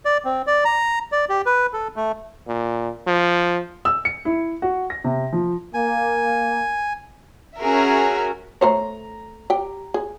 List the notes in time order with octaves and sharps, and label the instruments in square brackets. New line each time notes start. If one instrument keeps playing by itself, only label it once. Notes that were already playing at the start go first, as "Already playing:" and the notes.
[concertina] D5
C4
D5
A#5
D5
G4
B4
A4
A3
[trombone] A#2
F3
[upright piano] E6
C#7
E4
F#4
A#6
C3
F3
[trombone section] A#3 [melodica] G#5
[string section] C#4 F#4 G#4 A#4 E5
[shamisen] A3 C5 C#5 [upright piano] A#5
[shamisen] G4 G5
G#4